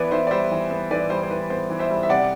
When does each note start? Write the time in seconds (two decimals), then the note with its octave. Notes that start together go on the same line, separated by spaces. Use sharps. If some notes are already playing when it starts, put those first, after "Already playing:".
Already playing: E3 B3 B4 D5
0.11 E3 C5 E5
0.27 D5
0.31 G3 C5 E5
0.51 E3
0.71 B3
0.91 E3 B4 D5
1.10 G3 C5
1.23 C5
1.30 E3 B4
1.50 B3 C5
1.70 E3
1.79 C5 E5
1.90 G3
2.03 E5
2.09 C3 D5 F#5